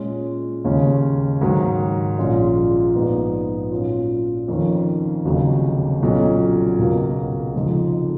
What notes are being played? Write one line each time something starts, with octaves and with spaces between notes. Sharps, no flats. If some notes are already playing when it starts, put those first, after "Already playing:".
Already playing: A#2 G#3 C#4
D#2 C#3 G#3 C#4
G#2 D#3 F#3
A#1 A#2 G#3 C#4 F4
A#1 G#2 F3 B3 D#4
A#2 F#3 C#4 F4
F2 D#3 A#3 C#4 F4
F1 D#2 C#3 F#3
B1 A#2 F#3 C#4
C#2 B2 F#3 A#3
F1 F2 C#3 G#3 D#4